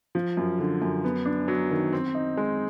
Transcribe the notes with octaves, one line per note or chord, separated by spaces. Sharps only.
F3
F#2
D3
F#2
B3
D4
F#3
D#3
C4
D#4
G#3